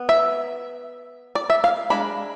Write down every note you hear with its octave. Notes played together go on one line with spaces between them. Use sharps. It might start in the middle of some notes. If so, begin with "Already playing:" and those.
Already playing: B3
E5
D5
E5
F5
G#3 D4 B5